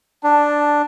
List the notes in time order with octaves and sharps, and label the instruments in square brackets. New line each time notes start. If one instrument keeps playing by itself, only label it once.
[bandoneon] D4 [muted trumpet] A5